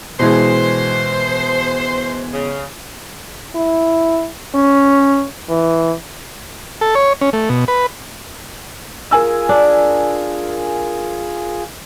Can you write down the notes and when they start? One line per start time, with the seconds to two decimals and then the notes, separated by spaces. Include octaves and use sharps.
0.19 B2 E3 G#3 C5
2.34 C#3
3.55 E4
4.55 C#4
5.49 E3
6.81 A4
6.95 C#5
7.21 C#4
7.33 A3
7.49 B2
7.68 B4
9.11 F4 G#4 A#4 G#5 E6
9.49 D4